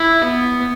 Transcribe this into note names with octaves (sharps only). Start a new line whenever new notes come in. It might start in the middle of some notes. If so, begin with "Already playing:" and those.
Already playing: E4
B3